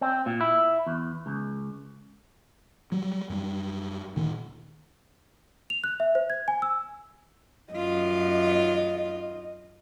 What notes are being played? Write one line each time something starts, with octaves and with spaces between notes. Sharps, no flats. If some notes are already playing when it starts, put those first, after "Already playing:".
C4
A#2
E4
E2
C#2
F#3 G3
F#2 G3
D2 A#2 D#3
F7
F#6
E5
C5
G#6
G#5
E6
F#2 F4 D#5